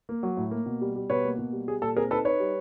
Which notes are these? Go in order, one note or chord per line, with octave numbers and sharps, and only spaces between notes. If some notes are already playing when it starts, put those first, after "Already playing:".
A#3
F#3
A2
A#3
B2
G3
G3
B2 B4 C#5
A#3
B2
G3
G3 G#4
A#2 A4
C4 G#4 A#4
D#4 A4 B4
D#4 B4 C#5
G3